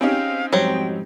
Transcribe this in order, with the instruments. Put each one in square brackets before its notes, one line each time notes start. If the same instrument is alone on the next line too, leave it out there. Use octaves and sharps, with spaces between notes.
[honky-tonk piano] C4 C#4 D#4 [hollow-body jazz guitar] G4 G#4 [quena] F5
[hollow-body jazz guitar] F2 G#2 G3 [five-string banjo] F#3 C5 [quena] G5